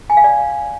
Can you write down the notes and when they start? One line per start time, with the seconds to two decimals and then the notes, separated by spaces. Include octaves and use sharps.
0.10 G#5
0.17 F5
0.24 D5